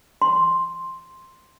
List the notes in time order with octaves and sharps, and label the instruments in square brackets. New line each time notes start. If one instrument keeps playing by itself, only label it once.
[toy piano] C6